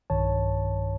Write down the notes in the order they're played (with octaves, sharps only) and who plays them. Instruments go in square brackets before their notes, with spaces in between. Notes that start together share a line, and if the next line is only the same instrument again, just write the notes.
[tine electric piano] B1 G2 D#3 C#5 A5